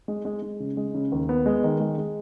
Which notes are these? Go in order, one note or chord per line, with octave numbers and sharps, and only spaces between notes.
G#3
G#3
G#3
C#3
G#3
C#3
D#2
B3
G#3
D#3
G#3
G#3